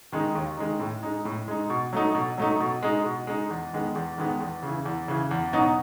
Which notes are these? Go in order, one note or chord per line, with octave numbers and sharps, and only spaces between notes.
D#3 G#3 D#4
D#2
D#3 G#3 D#4
A2
G#3 D#4
A2
G#3 D#4
B2
F#3 A3 D#4
B2
F#3 A3 D#4
B2
G#3 D#4
B2
G#3 D#4
E2
D#3 G#3 B3
E2
D#3 G#3 B3
E2
C#3
E3
E2
C#3 E3
E2
B2 F#3 B3 D#4